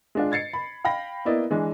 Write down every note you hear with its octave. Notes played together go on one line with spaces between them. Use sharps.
G#3 D4 F4
G#6 A6 C7 C#7
B5
F5 G5 B5 A#6
A#3 B3 E4 D5 D#5
E3 G#3 D4